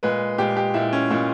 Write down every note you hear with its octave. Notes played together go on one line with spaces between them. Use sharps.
A#2 G#3 B4
A#2 G#3 G4
G4
A#2 G#3 E4
C#4
A#2 G#3